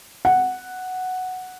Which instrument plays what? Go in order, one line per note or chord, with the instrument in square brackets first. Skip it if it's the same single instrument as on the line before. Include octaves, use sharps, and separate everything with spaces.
[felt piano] F#5